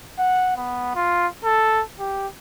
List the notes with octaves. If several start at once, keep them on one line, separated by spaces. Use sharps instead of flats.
F#5
B3
F4
A4
G4